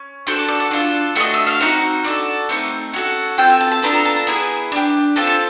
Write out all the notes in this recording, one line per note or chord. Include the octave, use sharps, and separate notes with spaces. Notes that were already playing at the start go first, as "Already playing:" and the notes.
Already playing: C#4
D4 F#4 A4 C5
D5
D5
F#5
D4 F4 A4
A3 D4 F#4 A4 D#5
E5
F5
C4 D#4 F#4 F#5
D4 F#4 A4
A3 C4 D#4 F#5
C#4 F#4 A4 F#5
C4 F4 A4 G5
G#5
A5
A5
B3 D4 F4 A4 A#5
A#5
A5
A#5
B3 E4 G#4
D4 G4
C4 F4 A4 A5
A5